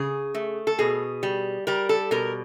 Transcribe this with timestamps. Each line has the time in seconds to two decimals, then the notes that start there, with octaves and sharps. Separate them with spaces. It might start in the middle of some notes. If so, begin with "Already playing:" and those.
Already playing: C#3 G#4
0.35 A3
0.67 A4
0.79 B2 G#4
1.23 G3
1.67 G3 A#4
1.89 A4
2.11 B2 A#4